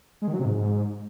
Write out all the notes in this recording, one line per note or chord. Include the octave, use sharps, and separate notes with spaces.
G#3
D#3
F#3
C3
G#2